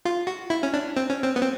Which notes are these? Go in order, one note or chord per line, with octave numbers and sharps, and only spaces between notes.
F4
F#4
E4
C#4
D4
C4
C#4
C4
B3
C4